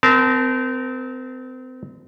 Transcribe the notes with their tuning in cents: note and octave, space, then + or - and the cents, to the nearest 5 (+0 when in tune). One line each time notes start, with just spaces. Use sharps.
C4 -30 A#4 +0 A5 -20